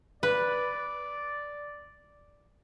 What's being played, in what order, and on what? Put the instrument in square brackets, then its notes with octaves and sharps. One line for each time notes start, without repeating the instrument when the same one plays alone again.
[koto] B4 [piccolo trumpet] D5